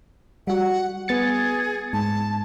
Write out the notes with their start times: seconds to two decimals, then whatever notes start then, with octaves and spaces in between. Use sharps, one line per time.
0.47 G3 F#4 F#5
1.08 B3 G#4 A6 C#7
1.93 G#2 A5